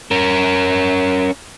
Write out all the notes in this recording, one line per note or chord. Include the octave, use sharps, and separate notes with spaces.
C#4 A#4